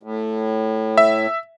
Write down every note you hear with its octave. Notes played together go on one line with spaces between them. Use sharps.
A2
E5